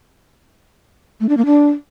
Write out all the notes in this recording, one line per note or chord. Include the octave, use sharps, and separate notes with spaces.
A3
D4
A#3
D4